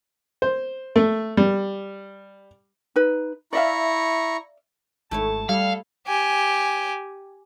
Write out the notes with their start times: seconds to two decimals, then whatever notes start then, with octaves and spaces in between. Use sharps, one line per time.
0.42 C5
0.96 A3
1.37 G3
2.96 D#4 B4
3.53 E4 D5 E5 F5 A#5 C#6
5.11 G#1 A3 E4 C#5 A5
5.49 G3 E4 A4 F5
6.07 G4 G#5